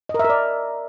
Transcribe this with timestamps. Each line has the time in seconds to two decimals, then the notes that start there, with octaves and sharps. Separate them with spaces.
0.09 D#5
0.14 A#4
0.19 E5
0.25 A#4
0.30 D5